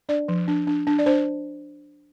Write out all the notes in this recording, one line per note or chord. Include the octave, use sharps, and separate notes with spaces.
D4 D5
F3
D4
D4
D4
D5
D4 C5